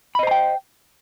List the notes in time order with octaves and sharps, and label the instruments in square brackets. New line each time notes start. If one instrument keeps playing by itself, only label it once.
[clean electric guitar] B5
D#5
C5
A#5
G5